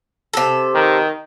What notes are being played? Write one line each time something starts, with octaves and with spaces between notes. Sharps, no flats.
C3 A4
D#3